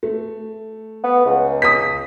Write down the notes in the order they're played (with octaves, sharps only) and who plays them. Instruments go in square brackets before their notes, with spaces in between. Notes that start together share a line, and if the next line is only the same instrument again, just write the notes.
[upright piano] A3
[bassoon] B3
C#2
[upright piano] D#6 B6